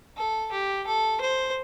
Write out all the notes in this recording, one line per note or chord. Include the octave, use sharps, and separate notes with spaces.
A4
G4
A4
C5